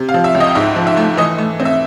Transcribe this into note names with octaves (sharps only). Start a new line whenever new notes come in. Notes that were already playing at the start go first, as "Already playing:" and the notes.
Already playing: C3
F5
F3
E5
C#2
D#5
G#2 E5
F3
E5
A3
E3 D#5
A3
C4
E5